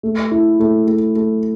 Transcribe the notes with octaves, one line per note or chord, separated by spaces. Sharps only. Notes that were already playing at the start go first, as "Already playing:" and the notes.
A3
E4
A3
A3
A3